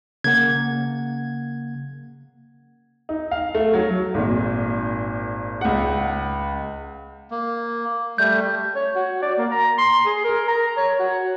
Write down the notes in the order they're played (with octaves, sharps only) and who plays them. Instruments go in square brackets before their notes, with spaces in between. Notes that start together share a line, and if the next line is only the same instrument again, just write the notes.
[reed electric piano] C#3 A#3 F#5 [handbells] G#6
[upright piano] D#4
F5
A3
F#3
[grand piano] G#1 A#2
C#2 F#5
[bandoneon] A#3
[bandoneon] G3 A3 [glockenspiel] G6
[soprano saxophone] C#5
F#4
D5
A#3
A#5
C6
G#4
A#4
A#5
C#5
F#4